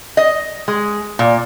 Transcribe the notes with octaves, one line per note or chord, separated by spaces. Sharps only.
D#5
G#3
A#2